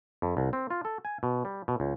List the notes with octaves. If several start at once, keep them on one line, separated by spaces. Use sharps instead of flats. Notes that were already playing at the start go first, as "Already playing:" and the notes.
F2
C2
C4
F4
A4
G#5
B2
G3
B2
C#2